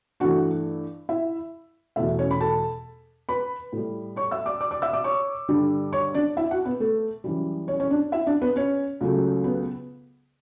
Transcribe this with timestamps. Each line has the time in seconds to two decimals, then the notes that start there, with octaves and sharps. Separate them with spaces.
0.20 G2 E3 A3 F#4 F#5
1.09 E4 E5
1.96 E2 B2 A3 E4 E5
2.19 C#4 C#5
2.31 B5
2.41 A4 A5
3.29 B4 B5
3.72 A2 G3
4.16 C#5 C#6
4.31 E5 E6
4.46 D5 D6
4.61 D5 D6
4.71 D5 D6
4.82 E5 E6
4.93 D5 D6
5.04 C#5 C#6
5.48 G2 D3 G3
5.93 C#5 C#6
6.14 D4 D5
6.37 E4 E5
6.51 F#4 F#5
6.65 B3 B4
6.80 A3 A4
7.24 F#2 E3 G3
7.68 C#4 C#5
7.80 C#4 C#5
7.90 D4 D5
8.12 E4 E5
8.26 D4 D5
8.42 B3 B4
8.56 C#4 C#5
9.01 C#2 C#3 F#3 A3
9.44 B3 B4